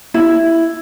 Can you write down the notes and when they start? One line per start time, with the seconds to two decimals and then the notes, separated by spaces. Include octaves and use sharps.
0.14 E4